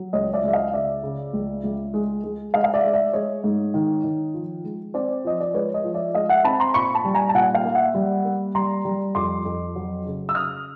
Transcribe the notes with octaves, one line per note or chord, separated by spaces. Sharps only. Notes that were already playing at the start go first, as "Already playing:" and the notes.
Already playing: F#3
C#2 C#5 D#5
D5 E5
C#2 E5
D#5 F5
C#3 D5 E5
C#3
C#2
C#2
G#3
G#3
G#3 D#5 F5
F5
D5 E5
G#3
D5 E5
G#3 C#5 D#5
G#2
D#3
D#3
F3
G#3
C4 C5 D5
F3 D#5
D5
G#3 B4 C#5
C#5 D#5
F3
D5 E5
G#3 D#5 F5
E5 F#5
C4 A5 B5
A#5 C6
A#2 B5 C#6
A5 B5
G3
G#5 A#5
A5
A#2 F#5 G#5
F5 G5
A#3
E5 F#5
G3
A#3
G3 A#5 C6
G3
F2 C6 D6
F2
F#3
C#3
E6
C#3 D#6 F6